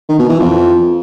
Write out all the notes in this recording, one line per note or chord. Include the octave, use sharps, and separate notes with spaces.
D#3
B2
E3
F2